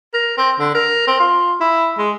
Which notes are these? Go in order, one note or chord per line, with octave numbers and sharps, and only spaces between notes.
A#4
C4
D3
A#4
C4
F4
E4
G#3